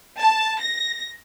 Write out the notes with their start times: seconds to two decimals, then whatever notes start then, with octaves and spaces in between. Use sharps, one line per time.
0.19 A5
0.60 A#6